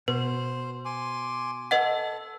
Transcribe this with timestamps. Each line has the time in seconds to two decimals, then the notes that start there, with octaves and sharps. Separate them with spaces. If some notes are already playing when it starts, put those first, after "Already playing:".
0.08 B2 B4 C5
0.85 G#5 C6 D6
1.71 A4 B4 D#5 F#5